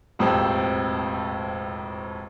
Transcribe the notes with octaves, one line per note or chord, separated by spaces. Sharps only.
E1 F2 A2 C3 C4